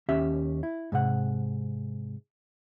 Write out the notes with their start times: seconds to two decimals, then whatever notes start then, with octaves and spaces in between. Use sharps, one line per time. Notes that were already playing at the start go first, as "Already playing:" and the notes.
0.09 D#2 C#4 G4 E5
0.63 E4
0.92 G#2 C3 F#5